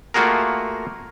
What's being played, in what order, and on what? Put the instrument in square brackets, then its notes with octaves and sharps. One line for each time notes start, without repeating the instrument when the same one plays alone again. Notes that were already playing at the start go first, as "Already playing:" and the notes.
[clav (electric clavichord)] A3 A#3 F4 F#4 G#4 A#4